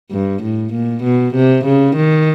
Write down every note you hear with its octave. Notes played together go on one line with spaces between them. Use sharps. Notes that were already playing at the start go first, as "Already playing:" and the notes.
G2
A2
A#2
B2
C3
C#3
D#3